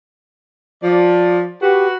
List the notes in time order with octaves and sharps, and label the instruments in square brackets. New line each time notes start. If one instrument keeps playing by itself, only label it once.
[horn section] F3 D5
[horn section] F#4 B4 [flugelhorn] G4